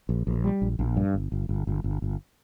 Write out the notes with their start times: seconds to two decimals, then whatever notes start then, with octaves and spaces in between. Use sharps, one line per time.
0.09 A#1
0.27 A#1
0.44 G3
0.62 A#1
0.79 A#1
0.97 G2
1.14 G1
1.32 G1
1.49 G1
1.67 G1
1.84 G1
2.02 G1